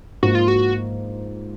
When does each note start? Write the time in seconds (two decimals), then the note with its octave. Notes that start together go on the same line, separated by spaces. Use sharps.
0.23 G#2 F3 A#3 F#4
0.35 F4
0.48 F#4